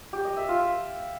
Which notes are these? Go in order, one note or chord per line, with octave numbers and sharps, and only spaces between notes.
G4
D#5
E5
F4
E5